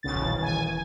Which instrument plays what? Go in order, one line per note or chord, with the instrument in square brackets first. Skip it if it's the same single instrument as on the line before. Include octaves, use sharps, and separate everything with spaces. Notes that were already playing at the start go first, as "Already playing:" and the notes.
[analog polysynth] B1 C#3 A6
[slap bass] D#1 [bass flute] E3
[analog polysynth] G#5